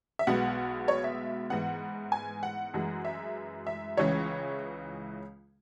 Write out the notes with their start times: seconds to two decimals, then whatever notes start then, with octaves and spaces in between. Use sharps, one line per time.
0.19 E5
0.27 B1 B2 G#3 B3 F#5
0.88 C#5
1.04 E5
1.50 G#2 E3 B3 F#5
2.12 G#5
2.43 F#5
2.74 F#2 E3 G#3
3.05 E5
3.67 E5
3.97 C#2 C#3 E3 G#3 C#4 C#5